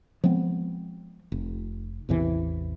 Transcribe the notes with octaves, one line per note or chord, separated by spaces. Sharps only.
F3 G#3 B3 C4
F1
A1 E2 C3 E3